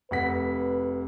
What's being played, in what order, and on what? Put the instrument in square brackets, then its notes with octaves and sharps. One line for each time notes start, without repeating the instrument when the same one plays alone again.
[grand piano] F1 F#5 B6 [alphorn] B4